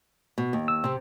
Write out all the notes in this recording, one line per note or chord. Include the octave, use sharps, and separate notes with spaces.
B2
D#2
E6
C3 C4